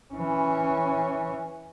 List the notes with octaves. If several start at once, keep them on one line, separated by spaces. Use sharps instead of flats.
E3 C#4